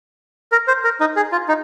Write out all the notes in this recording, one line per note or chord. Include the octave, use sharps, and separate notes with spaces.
A#4
C5
A#4
D#4
G#4
F4
D#4